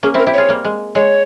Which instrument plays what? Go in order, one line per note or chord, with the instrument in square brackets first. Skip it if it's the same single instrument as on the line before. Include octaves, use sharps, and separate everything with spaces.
[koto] A#3 C#4 [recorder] G#4
[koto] C4 E4 [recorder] A#4
[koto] E4 G4
[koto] F4 G#4 [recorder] C#5
[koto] G3 A#3
G#3
[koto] G#3 [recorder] C#5